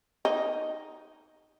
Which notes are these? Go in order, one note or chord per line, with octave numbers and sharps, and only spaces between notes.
D#4